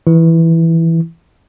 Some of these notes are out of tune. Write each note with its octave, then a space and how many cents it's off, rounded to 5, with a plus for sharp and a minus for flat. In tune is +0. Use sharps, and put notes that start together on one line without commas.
E3 +0 E4 +0